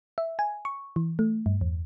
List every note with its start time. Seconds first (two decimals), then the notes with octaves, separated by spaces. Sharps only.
0.18 E5
0.39 G#5
0.65 C#6
0.96 E3
1.19 A3
1.46 G2
1.61 E2